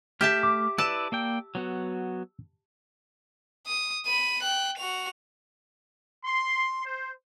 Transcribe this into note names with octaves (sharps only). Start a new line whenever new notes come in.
A3 G4 E5 A5 F6 G6
D6
E4 B4 D5 A5 E6
A#3 D5 G5
F#3 B3 F#4
D#6
B5 D#7
G5 F#6
F#4 F7
C6
C5